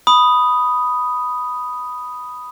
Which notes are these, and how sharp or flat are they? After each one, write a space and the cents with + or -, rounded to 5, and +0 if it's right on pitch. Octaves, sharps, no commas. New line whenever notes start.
B5 +0 D#6 +0